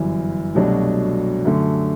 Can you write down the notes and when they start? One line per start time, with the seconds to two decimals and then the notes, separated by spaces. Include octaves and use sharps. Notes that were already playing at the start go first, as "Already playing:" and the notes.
Already playing: G1 F#2 E3
0.55 C2 B2 F#3 A3 D4
1.45 F#2 D3 A3